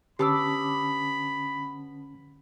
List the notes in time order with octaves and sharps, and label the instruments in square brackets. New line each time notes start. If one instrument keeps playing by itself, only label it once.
[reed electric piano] D3 C#4 A5 [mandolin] B3 D6 E6 [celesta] G4 [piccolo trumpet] B5